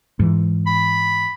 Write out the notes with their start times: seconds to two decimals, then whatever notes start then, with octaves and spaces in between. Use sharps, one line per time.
0.19 G#2 E3
0.67 B5